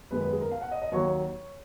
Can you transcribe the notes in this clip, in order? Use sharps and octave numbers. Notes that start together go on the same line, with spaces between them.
F#2 D#3 G#3 B3 B4
B4
G#4
A#4
F5
F#5
D#5
D#5
D#2 D#3 F#3 C#5